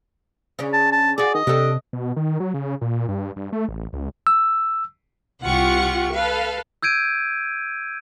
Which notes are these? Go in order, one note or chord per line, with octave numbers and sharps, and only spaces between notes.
C#3 C#4 D4
A5
A5
F#4 G#4 D5
D#3 D#5
C3 D4 G4 A4
B2
D#3
F#3
C#3
A#2
G2
G2
A3
A1
C#2
E6
C2 F4 G4 F#5 C#6 C#7
A4 B4 F5
E6 G6 G#6 D7 D#7